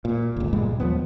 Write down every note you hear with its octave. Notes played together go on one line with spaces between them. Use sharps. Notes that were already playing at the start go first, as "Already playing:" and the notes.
A#2
G1 C#2
G2 A#2 G3 G#3
D#2 F3 B3